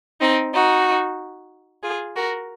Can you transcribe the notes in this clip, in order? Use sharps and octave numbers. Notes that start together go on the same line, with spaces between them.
C4 D#4
D#4 F#4
F4 G#4
F#4 A#4